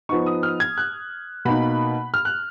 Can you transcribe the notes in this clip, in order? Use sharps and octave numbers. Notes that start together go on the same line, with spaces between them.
F3 B3 D#4 C#6
D#6
F6
G#6
F#6
B2 A#3 D#4 B5
F6
F#6